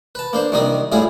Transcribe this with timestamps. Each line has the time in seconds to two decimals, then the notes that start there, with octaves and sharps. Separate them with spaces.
0.15 B4 A5
0.33 A#3 D4 C5
0.52 C2 D#3 G3 D4 D#4 D#6
0.92 A2 G3 E4 F4 G#4